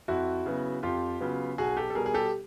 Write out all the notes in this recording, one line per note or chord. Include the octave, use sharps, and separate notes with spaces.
F2 E4 F#4
C#3 F#3 B3
F2 F4 G4
C#3 F#3 B3
B1 F#4 G#4
G4 A4
A4
B2 G3 G#4 A#4
G#4
G4 A4